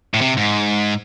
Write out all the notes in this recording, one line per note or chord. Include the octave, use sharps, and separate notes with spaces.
A2
C3
G#2